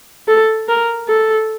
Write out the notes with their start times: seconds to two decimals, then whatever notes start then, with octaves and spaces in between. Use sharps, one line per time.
0.28 A4
0.68 A#4
1.09 A4